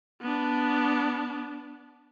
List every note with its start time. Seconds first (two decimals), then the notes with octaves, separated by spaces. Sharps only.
0.22 B3 D4